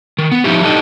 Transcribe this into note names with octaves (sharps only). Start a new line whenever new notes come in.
D#3
B3
F3 C#4 D#4 E4 G4
D4 D#4 G4 A4 D#5